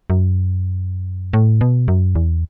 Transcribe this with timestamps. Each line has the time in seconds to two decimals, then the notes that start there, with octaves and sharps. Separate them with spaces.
0.10 F#2
1.33 A2
1.61 B2
1.88 F#2
2.15 E2